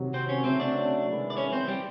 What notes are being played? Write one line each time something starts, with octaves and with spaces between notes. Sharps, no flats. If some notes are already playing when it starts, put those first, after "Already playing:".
Already playing: C3 D#3 F#3
C4 C5
C#4 C#5
C#3 F#3 A3 C4 C5
D4 D5
C3 D#3 G#3 B3 E4
D5
C#4 C#5
C4 C5
G3 G4